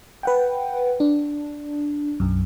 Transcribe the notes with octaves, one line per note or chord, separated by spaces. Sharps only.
B4 F#5 G5
D4
B1 F#2